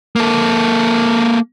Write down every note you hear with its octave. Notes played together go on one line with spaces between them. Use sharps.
A#3 A4